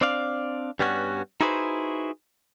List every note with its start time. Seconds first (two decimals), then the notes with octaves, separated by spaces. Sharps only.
0.01 C4 D4 D5 F5
0.80 G2 G3 B3 C#4 F4 F#4
1.41 D#4 E4 F#4 G#4 B4 C5